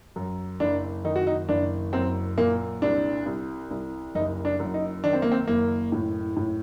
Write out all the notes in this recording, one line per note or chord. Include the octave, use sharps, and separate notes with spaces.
F#2
F#1 D4
D#3 D#4
F#4
D#4
F#1 D4
F#2 C4
A#2 A#3
C2 D4
C2
C2
F#1 D#4
D4
F#2
D#4
D#3 D4
C4
A#3
C4
F#1 A#3
A2
A2